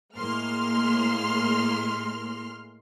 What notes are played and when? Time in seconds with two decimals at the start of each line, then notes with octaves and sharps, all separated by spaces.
0.16 A2 G#3 A#3 C6 F6